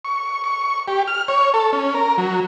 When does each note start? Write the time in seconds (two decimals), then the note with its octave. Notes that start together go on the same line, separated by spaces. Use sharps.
0.05 C#6
0.44 C#6
0.88 G4
1.08 F6
1.28 C#5
1.54 A4
1.73 C#4
1.94 A#4
2.18 F#3